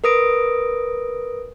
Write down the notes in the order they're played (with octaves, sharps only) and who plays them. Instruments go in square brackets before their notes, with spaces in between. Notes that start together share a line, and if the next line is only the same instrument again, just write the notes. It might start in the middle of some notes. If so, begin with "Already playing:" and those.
[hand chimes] A#4 B4 D#6 A#6 D7